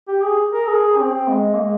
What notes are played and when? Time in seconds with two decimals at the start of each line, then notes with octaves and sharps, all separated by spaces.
0.08 G4
0.24 G#4
0.53 A#4
0.68 G#4
0.99 C4
1.29 G#3
1.54 A#3
1.60 G#3